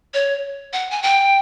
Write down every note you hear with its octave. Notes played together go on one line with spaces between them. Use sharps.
C#5
F#5
G#5
G5